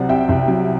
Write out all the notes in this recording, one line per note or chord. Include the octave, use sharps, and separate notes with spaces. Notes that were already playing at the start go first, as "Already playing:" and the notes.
Already playing: C2 F#3 C4 D5 F#5
C3 E5 G5
C2
F#3